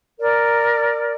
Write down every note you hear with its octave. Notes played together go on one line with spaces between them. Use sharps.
A#4 D5